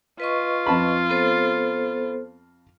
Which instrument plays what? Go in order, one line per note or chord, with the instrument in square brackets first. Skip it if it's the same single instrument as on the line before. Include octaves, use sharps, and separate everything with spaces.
[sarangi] F4 [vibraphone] B4 D#5 C#6
[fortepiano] F2 A5 B5
[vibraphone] B3 A4 C5